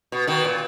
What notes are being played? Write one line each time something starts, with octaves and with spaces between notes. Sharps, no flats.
B2
B2 D#3
A#2